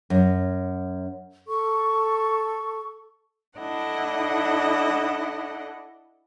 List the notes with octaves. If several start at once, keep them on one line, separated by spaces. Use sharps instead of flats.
F#2
A4 C#6
D4 E4 A4 D#5 F#5